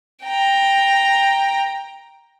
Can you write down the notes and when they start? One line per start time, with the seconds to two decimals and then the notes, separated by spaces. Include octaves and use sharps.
0.24 G5 A#5